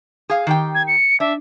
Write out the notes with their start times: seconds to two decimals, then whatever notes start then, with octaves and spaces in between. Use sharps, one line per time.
0.29 G#4 F5
0.47 D#3 G4 G5
0.75 G#6
0.87 C#7
1.20 D4 E5